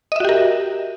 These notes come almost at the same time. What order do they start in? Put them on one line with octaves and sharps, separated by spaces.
D#5 E5 F#4 G4 A#4